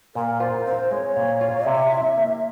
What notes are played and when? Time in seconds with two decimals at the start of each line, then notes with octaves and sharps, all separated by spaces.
0.15 A#2 A#4
0.40 F4 C5
0.66 C4 C5
0.91 G#3 C#5
1.16 A#2
1.41 F4
1.66 C3 E5
1.91 E4
2.17 A#3